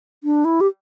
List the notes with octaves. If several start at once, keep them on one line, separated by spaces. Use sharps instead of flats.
D4
E4
G4